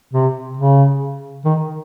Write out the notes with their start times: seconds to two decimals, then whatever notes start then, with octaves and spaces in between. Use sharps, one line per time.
0.13 C3
0.57 C#3
1.45 D#3